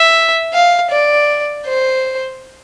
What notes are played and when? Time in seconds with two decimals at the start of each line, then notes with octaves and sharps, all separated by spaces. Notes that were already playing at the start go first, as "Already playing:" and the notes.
Already playing: E5
0.53 F5
0.91 D5
1.66 C5